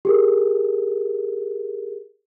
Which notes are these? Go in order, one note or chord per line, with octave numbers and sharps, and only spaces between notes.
G4 G#4 A#4